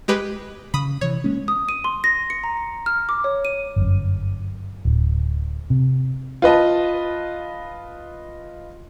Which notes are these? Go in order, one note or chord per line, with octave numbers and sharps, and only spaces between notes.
G#3 G4 B4
C#3 B5 D#6
C3 E3 C#5
G#3 A#3 C#4
D#6
D#7
C6
A#6
C#7
A#5
A#6
F6
D6
C#5
D#7
G1 F#2
D1
C3
F4 B4 D#5 A5